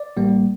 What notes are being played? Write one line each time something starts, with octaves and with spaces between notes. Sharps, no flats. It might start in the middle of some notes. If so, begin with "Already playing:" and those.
Already playing: D5
A1 A2 G3 A#3